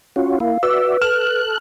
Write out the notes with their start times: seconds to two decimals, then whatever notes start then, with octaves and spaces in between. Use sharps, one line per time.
0.16 C#4 F4 F#4
0.40 A#3 E4 F5
0.63 F#4 B4 D5 E5 E6
1.02 A4 F6 F#6 E7